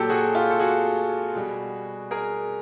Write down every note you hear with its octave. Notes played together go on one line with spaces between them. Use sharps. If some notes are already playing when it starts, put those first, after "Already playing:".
Already playing: A#2 F#3 G4 A4
F#4 G#4
F4 G4
A4
F#4 G#4
B2 G3
G#4 A#4